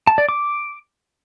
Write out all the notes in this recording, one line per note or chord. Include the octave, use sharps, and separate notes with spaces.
A5
D5
D6